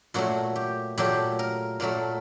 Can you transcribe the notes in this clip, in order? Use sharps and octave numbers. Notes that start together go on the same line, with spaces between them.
A#2 F#3 A3 F#4
G4
A#2 F#3 A3 G4
A#4
A#2 F#3 A3 A#4